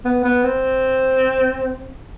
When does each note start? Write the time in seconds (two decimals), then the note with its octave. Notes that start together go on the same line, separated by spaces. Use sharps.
0.05 B3
0.24 B3
0.44 C4